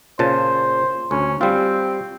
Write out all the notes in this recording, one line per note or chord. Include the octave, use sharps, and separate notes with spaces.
A#2 C#3 C5 A5
D2 C#4
G3 C4 F4